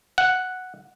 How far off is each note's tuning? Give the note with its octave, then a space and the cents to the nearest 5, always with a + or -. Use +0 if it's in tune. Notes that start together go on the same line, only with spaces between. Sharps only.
F#5 +0